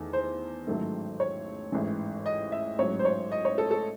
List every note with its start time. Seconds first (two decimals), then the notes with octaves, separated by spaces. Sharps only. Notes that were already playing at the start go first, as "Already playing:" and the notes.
Already playing: E2 D#3 A3
0.13 C5
0.67 A1 G#2 D#3 F#3 A3
1.20 C#5
1.72 A1 G#2 E3
2.26 D#5
2.52 E5
2.78 A1 G#2 F#3 C#5
2.99 C5
3.05 C#5
3.32 D#5
3.45 C#5
3.58 A4
3.71 A4